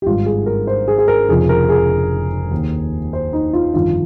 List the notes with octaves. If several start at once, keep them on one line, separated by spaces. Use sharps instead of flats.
G4
G#1 G2 F3 F4
G#4
A#4
C5
G#4
G#4
A#4
F1 F2 C#3 F3 G#4
A#4
G#4
D#2 D#3
C5
D#4
F4
G1 F2 D#3 F4